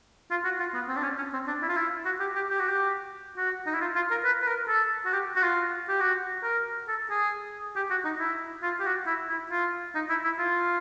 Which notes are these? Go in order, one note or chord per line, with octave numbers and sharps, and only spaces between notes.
F4
F#4
F4
B3
C4
D4
C#4
C#4
C4
D4
E4
F4
E4
F#4
G4
G4
G4
F#4
G4
F#4
D#4
E4
F4
F4
A#4
B4
B4
A#4
A4
F#4
G4
F#4
F4
G4
F#4
A#4
A4
G#4
G4
F#4
D#4
E4
F4
G4
F#4
E4
E4
F4
D#4
E4
E4
F4